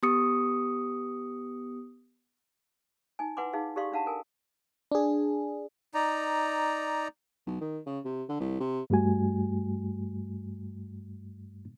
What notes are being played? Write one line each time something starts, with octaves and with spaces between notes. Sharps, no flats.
B3 G4 D#6 C#7
D#4 G#5
E4 B4 F#5 G#5 C6 D6
D#4 G#4 F5
G4 A4 D5 F5 C6 C#6
D4 G4 F5 F#5 A5 A#5
A4 A#4 G#5
D4 G#4
D#4 D5 A#5
B1
D#3
C#3
C3
D3
C2
C3
G2 G3 A3 F#4 G#5